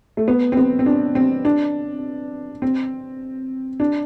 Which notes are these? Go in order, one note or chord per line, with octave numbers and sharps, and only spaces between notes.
A3
B3
C4
B3
C4
D4
C4
D4
C4
D4